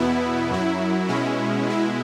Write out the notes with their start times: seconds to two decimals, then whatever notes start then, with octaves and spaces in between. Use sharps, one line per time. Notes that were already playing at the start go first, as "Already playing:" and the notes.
Already playing: E2 B2 B3 E4
0.50 F#2 F#3 E4
1.08 B2 G#3 C#4 E4
1.66 B2 G#3 E4